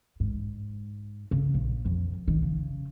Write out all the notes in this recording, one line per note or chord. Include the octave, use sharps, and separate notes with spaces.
G#2
C#3
A#1
F2
D#3
C#3